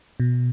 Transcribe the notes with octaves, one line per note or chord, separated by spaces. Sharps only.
B2